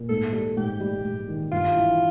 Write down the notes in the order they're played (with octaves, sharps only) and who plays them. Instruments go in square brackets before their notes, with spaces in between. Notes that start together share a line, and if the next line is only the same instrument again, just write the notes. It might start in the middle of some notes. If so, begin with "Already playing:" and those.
Already playing: [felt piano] A#2
[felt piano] G#2 [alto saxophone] A4
[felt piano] G3 [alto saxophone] A4
[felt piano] G#2 [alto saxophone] G4
[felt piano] G3
G#2
D#3
[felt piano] G2 [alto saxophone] F4
[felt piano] E3